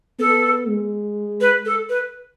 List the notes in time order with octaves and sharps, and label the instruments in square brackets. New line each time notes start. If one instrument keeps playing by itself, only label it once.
[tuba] B3 [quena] A4
[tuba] G#3
[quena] B4
A4
B4